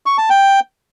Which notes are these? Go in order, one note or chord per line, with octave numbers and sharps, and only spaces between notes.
C#6
A5
G5